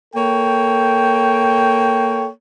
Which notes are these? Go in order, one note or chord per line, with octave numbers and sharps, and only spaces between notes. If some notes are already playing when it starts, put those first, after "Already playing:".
A#3 A4 C#5 G5